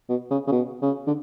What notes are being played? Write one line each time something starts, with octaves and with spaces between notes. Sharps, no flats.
B2
C#3
C#3
B2
C#3
D3